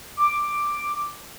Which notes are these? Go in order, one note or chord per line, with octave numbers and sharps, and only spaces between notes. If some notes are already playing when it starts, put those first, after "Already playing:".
D6